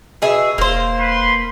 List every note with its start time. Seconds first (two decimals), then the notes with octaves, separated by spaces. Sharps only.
0.22 B2 G#4 E5
0.58 E1 A#3 C5
0.99 B4 C6